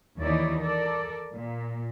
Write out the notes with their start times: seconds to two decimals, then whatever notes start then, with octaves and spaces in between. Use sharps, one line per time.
0.19 D#2 E3 D#4 E4 C#5 D5
0.61 A4 A#4 D5
1.34 A#2